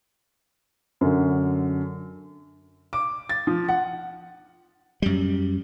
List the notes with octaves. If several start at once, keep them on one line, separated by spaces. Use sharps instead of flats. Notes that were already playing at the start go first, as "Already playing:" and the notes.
F#2 D3
D6
A6
F3
F#5
F#2 G3